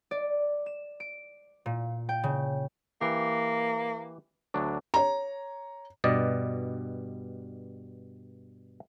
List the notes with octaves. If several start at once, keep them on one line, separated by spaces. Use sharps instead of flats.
D5
E7
D7
A#2
G5
C#3
E3 A#3 G4
D2 F#3 D4
C#5 A#5
G2 B2 G3 D5 D#5